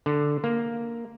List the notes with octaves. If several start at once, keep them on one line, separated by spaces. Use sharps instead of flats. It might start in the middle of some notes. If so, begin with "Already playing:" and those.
D3
A#3